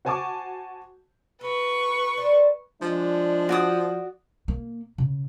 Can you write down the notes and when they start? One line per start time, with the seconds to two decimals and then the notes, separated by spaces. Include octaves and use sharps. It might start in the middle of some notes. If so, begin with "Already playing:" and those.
0.05 F#4 C5 G#5 A5 C#6 D6
1.41 F#4 A4 B4 C#6
2.17 D4 C5
2.82 F3 G#3 D4
3.49 F#4 D5 D#6
4.48 A#3
4.98 C#3